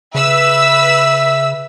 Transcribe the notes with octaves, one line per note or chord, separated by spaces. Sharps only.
C#3 B4 E5 E6 B6